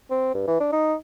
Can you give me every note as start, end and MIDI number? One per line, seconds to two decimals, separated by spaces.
0.10 0.34 60
0.34 0.46 43
0.47 0.60 52
0.60 0.69 62
0.72 0.95 63